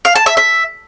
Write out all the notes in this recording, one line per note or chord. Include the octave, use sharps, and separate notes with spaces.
F5
A5
E5
E5